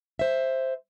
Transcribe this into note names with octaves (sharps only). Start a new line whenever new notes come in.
C5 E5